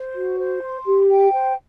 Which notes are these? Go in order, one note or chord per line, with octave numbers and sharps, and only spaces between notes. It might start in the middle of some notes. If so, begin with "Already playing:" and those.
Already playing: C5
F#4
C5
C6
G4
G5
C5